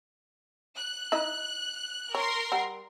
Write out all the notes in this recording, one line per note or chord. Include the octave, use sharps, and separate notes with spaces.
F#6
D#4 E4 D#5
A#4 C#5 C6
G3 F#5